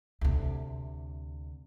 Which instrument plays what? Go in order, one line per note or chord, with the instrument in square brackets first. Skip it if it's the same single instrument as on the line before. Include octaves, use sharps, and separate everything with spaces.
[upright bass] D2 C3